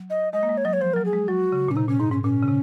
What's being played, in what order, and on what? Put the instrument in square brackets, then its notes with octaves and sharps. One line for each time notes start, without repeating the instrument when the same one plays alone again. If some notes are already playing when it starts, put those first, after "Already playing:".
Already playing: [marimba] F#3
[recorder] D#5
[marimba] G#3 [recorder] D#5
[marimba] A#3
G#3
[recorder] C#5
[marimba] F#3 [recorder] D#5
[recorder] C#5
[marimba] F3 [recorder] C5
[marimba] F#3 [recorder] A#4
[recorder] G#4
[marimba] G#3
[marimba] F#3 [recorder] F#4
[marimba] C#3
[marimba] A#2 [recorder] C#4
[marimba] C3 [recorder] D#4
[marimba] A#2 [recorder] C#4
[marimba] G#2 [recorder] D#4
[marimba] G#2 [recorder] C#4
[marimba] A#2 [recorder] C#4
[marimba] C#3
C3